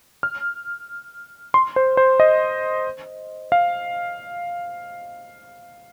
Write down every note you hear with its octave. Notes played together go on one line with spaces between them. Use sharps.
F6
C6
C5
C5
D#5
F5